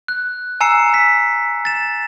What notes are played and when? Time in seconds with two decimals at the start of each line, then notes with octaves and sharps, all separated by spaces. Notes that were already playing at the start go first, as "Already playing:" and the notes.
0.08 F#6
0.60 G#5 A#5 E6 C7 C#7 E7
0.94 B6
1.65 A6 E7